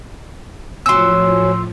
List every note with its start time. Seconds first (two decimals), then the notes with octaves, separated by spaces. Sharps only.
0.86 A2 F3 F#3 C#4 C6 E6